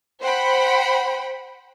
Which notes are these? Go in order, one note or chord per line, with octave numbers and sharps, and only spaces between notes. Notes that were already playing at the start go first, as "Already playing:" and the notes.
C5 F#5 G5 B5